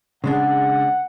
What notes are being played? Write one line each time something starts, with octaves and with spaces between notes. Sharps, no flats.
C#3 G#3 D4 F#5